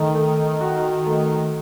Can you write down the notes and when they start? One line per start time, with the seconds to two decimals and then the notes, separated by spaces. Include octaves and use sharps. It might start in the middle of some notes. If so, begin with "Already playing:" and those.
Already playing: D#3 A3
0.15 A3
0.61 F#4
1.06 A3